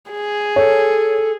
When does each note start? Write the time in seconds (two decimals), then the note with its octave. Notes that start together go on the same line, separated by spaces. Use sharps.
0.11 G#4
0.56 A4 C#5